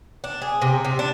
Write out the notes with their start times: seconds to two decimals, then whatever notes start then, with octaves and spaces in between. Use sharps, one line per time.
0.24 D4
0.42 G#4
0.62 C3
0.85 C3
0.99 D4